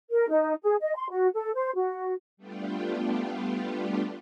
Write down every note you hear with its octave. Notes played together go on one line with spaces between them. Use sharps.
A#4
D#4
G#4
D#5
C6
F#4
A4
C5
F#4
G3 A3 B3 D4 F4 G4